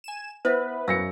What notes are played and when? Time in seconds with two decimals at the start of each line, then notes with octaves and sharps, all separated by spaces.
0.04 G#5 E7
0.45 B3 E4 B4 C5 E5
0.88 F#2 F5 E6 A#6 C#7